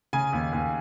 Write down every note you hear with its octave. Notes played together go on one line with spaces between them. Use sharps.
C#3 G#5
D#2
D#2